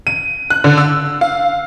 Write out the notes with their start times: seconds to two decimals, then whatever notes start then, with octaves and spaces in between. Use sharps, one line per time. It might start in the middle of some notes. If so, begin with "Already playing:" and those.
0.07 D#7
0.50 F#6
0.64 D3
0.78 E6
1.21 F5